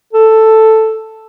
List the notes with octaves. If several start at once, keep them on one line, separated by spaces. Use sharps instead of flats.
A4